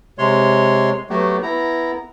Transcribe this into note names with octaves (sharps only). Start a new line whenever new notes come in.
C3 G#3 C#5 C6
F#3 A3 B3 F#4 G4
B3 E4 A#5